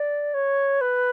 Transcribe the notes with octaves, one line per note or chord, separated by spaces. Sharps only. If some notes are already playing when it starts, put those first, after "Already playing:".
Already playing: D5
C#5
B4